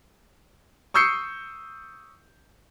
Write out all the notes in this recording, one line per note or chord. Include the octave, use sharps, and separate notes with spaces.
C#6 D#6 E6 G6 C7 C#7